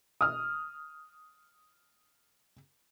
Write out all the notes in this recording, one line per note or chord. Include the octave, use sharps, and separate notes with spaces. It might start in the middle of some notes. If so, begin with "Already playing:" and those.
D#6 F6